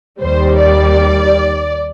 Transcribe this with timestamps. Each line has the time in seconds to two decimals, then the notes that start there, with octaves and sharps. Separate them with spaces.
0.21 D#2 D#3 G3 C5
0.58 D5